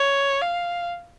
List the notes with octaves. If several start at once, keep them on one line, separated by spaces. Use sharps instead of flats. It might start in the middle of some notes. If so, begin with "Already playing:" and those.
Already playing: C#5
F5